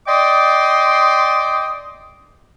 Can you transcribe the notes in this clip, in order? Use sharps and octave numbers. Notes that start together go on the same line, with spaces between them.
D5 D#5 G5 C6 D6 D#6